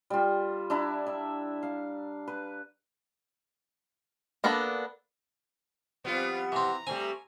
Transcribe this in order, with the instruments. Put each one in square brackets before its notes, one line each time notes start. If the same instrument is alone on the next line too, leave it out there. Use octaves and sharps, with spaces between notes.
[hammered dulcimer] G3 F4
D4 E4 A#5
E5
F5
B4
[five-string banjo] A#3 B3 D4 A4 B5
[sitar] F3 G3 B3 [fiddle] C4 F4
[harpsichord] E3 C4 [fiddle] A#5
[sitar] G3 A3 C4 [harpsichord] G#5